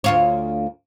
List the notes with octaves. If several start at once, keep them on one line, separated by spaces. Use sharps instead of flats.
D2 F4 C#5